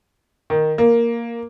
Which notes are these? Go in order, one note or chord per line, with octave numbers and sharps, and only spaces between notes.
D#3
A#3